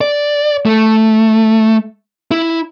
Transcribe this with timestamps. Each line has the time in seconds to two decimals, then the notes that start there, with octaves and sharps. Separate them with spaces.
0.01 D5
0.66 A3
2.31 E4